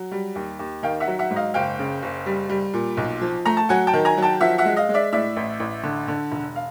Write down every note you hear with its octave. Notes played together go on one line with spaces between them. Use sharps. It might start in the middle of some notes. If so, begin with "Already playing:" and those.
Already playing: F#3
G3
D#2
D#2
D#3 F5 G5
E5 F#5
F#3
E5 F#5
G#2
D#5 F5
F#1 F5 G5
C#3
F#1
G3
G3
A#2
B1
F3
A3 A#5
A5
F#3 F#5 G#5
G5 A5
D#3
G#5 A#5
F#3
G5 A5
F3 E5 F#5
E5 F#5
G#3
D#5 F5
G#3
D5 E5
A2 D5 E5
A1
A1
D3
D3
E1
F5